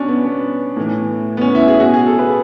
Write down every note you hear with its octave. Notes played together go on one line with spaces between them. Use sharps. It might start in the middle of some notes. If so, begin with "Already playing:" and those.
Already playing: B2 C#4 D4
B3
B3
A2 E3
B3
C#4
E4
G#4
B2 F#4
G#4
A4
B4